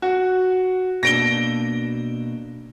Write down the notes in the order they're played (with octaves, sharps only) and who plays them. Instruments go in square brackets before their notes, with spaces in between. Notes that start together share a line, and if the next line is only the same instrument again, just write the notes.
[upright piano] F#4
[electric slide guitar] B2 A#3 D4 [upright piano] A#6 D7 G7